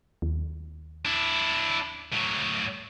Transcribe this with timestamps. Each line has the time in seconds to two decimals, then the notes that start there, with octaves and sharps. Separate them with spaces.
0.22 D#2
1.05 D4 E4
2.12 A2 F#3